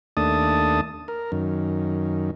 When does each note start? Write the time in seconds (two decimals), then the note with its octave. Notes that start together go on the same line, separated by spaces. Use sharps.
0.17 D#2 A3 D4 A5 D#6
1.08 A#4
1.32 F#2 D#3